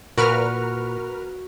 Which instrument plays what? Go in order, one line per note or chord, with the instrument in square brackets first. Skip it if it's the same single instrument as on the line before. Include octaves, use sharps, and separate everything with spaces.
[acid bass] A#2 [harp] F#4 [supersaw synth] A#4 B4 F6